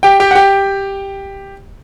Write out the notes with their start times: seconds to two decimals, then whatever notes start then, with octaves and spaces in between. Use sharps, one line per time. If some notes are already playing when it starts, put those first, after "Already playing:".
0.03 G4 G5
0.20 G4 G5
0.31 F#5
0.35 G4 G5